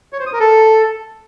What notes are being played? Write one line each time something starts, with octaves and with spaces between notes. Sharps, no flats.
C#5
C5
D#6
A#4
A4